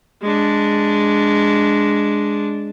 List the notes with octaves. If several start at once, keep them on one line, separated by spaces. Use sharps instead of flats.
G#3 D4